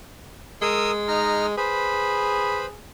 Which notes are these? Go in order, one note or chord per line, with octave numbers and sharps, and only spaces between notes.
G#3 A#4 D#6 E6
D#4 A#5 F6
G#4 B4 C5 B5